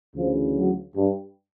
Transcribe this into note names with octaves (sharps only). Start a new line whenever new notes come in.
D2 C#3 E3 F3
F#3
G2 G3